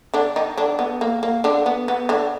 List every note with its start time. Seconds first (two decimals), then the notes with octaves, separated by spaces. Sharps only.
0.14 D3 D4
0.36 D#3 D#4
0.57 D3 D4
0.79 B3
1.01 A#3
1.23 A#3
1.44 D3 D4
1.66 B3
1.88 B3
2.09 D3 D4